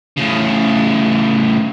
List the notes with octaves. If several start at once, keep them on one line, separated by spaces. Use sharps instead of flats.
A2 C#3